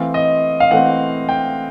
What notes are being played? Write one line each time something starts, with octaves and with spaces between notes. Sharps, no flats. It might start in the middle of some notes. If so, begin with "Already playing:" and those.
Already playing: E3 A3 C4 F5
D#5
F5
E3 A3 C4 F#5
G5